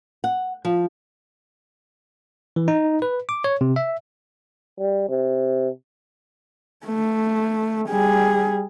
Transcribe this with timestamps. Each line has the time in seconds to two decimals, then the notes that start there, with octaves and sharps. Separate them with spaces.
0.24 F#5
0.65 F3
2.56 E3
2.68 D#4
3.02 B4
3.29 D6
3.44 C#5
3.61 C3
3.76 E5
4.79 G3
5.09 C3
6.86 A3
7.89 G3 G#4